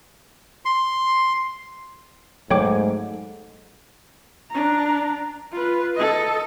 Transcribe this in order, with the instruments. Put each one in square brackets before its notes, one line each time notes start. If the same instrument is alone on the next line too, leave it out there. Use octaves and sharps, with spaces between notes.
[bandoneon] C6
[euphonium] G#2 [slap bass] F#3 A3 A#3 [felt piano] A4 [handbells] C#5 G5 D6
[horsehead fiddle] D4 A#5
F4 B4
A4 D#5